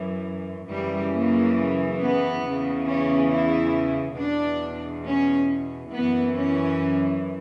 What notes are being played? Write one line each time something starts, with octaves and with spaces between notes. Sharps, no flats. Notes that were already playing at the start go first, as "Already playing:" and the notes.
Already playing: F#2 E3
F#2 C#3 E3 G3
A#3
B3
E2 C#3 E3
C#4
E4
E2 B2 D4
C#4
F#2 E3 B3
C#4